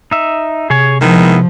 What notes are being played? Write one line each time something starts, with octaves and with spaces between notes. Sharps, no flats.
D#4 E5
C3 G#4 C#5 G#5
D#3 F3 G#3 B3 E4